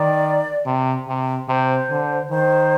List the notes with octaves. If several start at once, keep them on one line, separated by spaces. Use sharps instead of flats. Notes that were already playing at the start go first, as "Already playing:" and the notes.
Already playing: D#3 D5
C3
C3
C3 C5
D3
D#3 C5